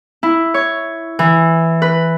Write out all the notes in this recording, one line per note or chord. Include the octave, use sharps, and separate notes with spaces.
E4
C#5
E3
B4